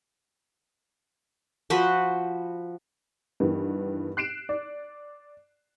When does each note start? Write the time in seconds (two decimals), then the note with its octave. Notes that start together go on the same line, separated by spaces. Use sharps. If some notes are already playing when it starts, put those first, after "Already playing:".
1.70 F3 F#4 B4 C5
3.40 G2 D#3 E3 B3
4.17 F#6 C7 D7 E7
4.49 D5